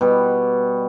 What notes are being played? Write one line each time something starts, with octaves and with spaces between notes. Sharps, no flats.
B2 G3